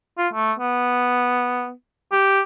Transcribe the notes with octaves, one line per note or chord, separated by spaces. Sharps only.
F4
A3
B3
G4